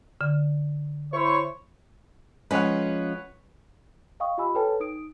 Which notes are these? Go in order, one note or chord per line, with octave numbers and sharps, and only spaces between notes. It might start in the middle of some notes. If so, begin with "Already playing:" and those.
D3
E4 C5 C#5 C#6
F3 G#3 C#4 B4 C#5 F#5
D#5 F5 G5 C#6 D#6
F4 G4 D#5 G#5 B5 E6
A4 B4 C#5 G5 A5
D#4 D#6 D7